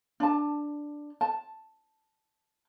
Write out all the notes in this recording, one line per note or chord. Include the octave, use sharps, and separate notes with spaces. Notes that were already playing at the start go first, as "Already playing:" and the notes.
D4 A5
A5